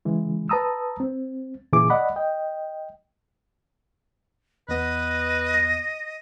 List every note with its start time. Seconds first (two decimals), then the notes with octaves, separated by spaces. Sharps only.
0.05 C#3 E3 G#3
0.49 B4 A5 A#5 D#6 E6
1.00 C4
1.73 A#2 C#3 E3 G#4 D6
1.90 D5 D#5 F#5 B5
2.16 D#5 G5
4.69 E2 B3 B4 D#5
5.54 A#6